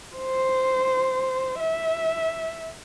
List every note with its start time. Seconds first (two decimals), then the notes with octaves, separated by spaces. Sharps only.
0.16 C5
1.60 E5